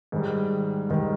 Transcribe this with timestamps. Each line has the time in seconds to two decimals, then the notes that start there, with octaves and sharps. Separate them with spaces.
0.12 G#2 D#3 G3
0.89 G#2 D#3 G3